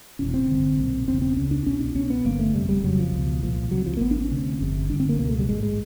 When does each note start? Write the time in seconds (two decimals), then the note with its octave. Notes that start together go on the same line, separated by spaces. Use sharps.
0.19 F1 E2 B2 C#4
0.34 C4
0.48 G#1 G2 D3
0.78 B1 A#2
1.07 E1 E2 C#3 C4
1.22 C4
1.36 C#2 C#3 C#4
1.51 D4
1.66 C2 B2 C#4
1.80 D4
1.95 C2 B2 C#4
2.10 B3
2.25 G1 G2 D3 A#3
2.39 A3
2.54 G1 F2 C3 G3
2.69 G3
2.83 F1 F2 C#3 F#3
2.99 F3
3.13 C#2 B2
3.43 C2 A#2 F3
3.71 C#2 C3 F#3
3.86 F3
3.97 A#3
4.01 G#1 G#2 B3
4.11 D4
4.21 C#4
4.30 D2 C3
4.60 G1 F2 C3
4.89 G1 G2 D3 D4
5.00 C4
5.09 A#3
5.19 C#2 B2 A#3
5.29 A3
5.39 G3
5.49 A1 G#2 G#3
5.63 G#3